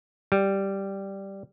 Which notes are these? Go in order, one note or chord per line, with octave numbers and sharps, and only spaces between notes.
G3